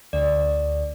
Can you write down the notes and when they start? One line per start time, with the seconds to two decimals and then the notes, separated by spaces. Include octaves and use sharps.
0.13 D2 D5